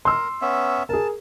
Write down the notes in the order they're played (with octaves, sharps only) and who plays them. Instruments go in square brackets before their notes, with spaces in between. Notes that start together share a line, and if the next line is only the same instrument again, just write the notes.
[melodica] A#4 [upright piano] C6 E6
[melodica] B3 C#4 E5
[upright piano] G#4 A#4 [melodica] A5